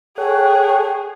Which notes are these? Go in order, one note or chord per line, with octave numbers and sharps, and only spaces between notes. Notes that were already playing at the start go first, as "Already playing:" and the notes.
G#4 A4 C#5 F#5 G5